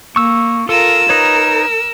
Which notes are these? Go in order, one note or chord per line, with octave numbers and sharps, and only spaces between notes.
A#3 C#6 E6
F4 A4 A#4 E6
D#4 A#4 B4 C#5